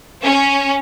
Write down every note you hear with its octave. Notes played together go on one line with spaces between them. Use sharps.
C#4